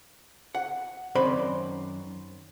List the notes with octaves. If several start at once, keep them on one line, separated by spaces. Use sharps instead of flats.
F#5
F#2 D#3 C4 C5 D5 B5